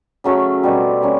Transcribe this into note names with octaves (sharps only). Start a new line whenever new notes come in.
C#3 F#3 A3 C#4
B2 G3 C4
G3 A#3 C#4